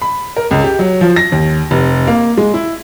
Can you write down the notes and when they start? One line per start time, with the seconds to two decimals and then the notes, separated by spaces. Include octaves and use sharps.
0.02 B5
0.37 A#4
0.51 C#2
0.64 G4
0.79 F#3
1.01 F3
1.16 A#6
1.32 D#2
1.71 F1
2.07 A#3
2.37 G#3
2.54 E4